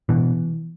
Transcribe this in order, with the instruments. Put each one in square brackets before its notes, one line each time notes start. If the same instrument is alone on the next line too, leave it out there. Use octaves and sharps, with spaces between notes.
[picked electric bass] B2 E3